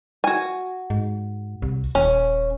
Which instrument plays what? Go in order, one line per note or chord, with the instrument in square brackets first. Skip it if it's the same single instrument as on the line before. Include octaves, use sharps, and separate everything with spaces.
[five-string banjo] F#4 G#5
[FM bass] G#2
C2
[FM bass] D#1 [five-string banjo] C#4